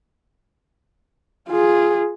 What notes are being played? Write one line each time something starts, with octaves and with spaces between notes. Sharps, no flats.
F4 G#4